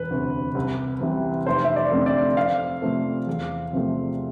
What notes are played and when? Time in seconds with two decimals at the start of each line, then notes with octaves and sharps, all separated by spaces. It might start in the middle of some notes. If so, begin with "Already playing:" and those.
Already playing: E1 B4
0.11 D2 C3
0.55 C2
1.00 C3 E3 G3
1.46 F1 C5
1.64 E5
1.76 D5
1.92 F2 D3 A3
2.06 D5
2.37 F2 F5
2.82 C3 F3 A3
3.27 E2
3.73 C3 F3 A3